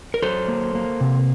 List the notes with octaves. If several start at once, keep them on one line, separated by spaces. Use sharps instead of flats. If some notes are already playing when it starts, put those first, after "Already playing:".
A#4
F#3 A4 C5
A#3
A#3
C3